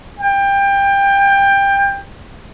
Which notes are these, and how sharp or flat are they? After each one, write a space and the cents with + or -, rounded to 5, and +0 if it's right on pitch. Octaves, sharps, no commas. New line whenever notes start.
G5 +20